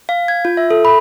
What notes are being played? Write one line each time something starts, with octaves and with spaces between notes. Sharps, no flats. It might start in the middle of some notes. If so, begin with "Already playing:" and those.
F5
G#6
F4
E5
A4
B5